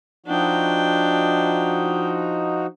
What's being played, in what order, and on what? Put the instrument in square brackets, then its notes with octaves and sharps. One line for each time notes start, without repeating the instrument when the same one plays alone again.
[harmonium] F3 D#4 F#4 [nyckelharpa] D4 G5